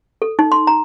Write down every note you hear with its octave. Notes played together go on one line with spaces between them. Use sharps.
A4
D#4
C6
A#5